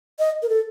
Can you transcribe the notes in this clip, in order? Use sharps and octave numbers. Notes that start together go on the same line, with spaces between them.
D#5
A#4
A4